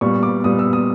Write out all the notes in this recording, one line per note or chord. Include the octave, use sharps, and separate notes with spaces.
A#2 G3 B3 C#6
D6
A#2 G3 B3 D#6
E6
D#6